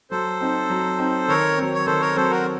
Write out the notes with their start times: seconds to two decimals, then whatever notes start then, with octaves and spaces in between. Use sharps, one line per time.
0.11 F#3 A4 C5
0.41 C4 D#4
0.70 F#3
0.99 C4 D#4
1.28 D#3 A#4 C#5
1.57 F#3 C4
1.74 C#5
1.86 D#3 A4 C5
2.01 A#4 C#5
2.15 F#3 C4 A4 C5
2.30 F#4 A#4